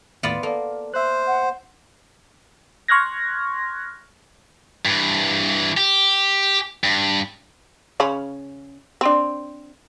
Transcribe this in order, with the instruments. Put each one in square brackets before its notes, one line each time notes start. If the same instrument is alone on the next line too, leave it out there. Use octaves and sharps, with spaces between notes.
[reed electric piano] D#2 A2 D#3 [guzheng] B3 F4 D5
[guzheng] A#3 [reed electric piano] A4 D5
[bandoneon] C5 [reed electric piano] E5 F#6
[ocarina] F#5
[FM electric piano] C6 C#6 F6 F#6 G#6 A#6
[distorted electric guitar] G2 E3
G4
G2
[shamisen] C#3 C#4 B5
C4 D4